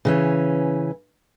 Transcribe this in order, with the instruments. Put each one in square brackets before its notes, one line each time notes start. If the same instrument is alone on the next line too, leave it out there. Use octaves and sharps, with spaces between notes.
[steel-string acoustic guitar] C#3 E3 C#4